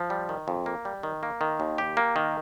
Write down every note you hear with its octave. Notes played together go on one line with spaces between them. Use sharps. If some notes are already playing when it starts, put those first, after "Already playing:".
Already playing: F3
G3
D#3
F2
A#3
G3
D#3
A#3
D#3
D#2
G4
A#3
D#3